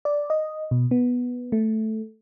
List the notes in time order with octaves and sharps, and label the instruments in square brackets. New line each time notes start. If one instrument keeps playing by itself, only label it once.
[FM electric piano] D5
D#5
B2
B3
A3